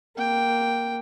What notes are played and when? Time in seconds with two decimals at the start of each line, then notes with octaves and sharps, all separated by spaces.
0.16 A#3 G5